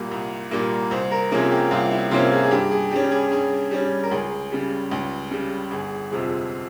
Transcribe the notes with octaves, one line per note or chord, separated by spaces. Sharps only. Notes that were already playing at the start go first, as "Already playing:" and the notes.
Already playing: C2 A#2 G3 A#3
C2
A#2 G3 A#3
C2 C5
A#4
C3 F3 A#3 C#4 G#4
G4
C2 F4
E4
C3 F3 A#3 C#4 F4
G#4
G#4
G2 G4
G#4
G3 C#4 G4
G#4
G2 G#4
G3 C#4
A#4
C#2 G#4
C#3 G3
C#2
C#3 G3
G1 G#4
F2 C3 F3 G#3